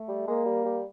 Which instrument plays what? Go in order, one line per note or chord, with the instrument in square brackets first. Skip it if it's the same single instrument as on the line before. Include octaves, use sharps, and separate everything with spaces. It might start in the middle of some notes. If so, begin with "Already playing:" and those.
Already playing: [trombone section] A3
[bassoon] G3
[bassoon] G#3 [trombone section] A#3
[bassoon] G3
G3